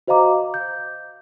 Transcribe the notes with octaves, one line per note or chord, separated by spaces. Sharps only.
F#4 C5 D#5 F5 A#5 D6
G6